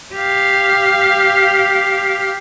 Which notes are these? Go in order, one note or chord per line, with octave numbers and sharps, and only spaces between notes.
G4 F5